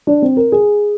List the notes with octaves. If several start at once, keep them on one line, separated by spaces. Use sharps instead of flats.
D4
C4
A#4
G#4